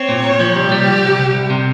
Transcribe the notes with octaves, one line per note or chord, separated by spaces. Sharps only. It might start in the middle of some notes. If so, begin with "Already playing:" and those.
Already playing: C4 C#5
A#2
A#2
F3
C2 G4
G3
C2
C2
C2
C2
C3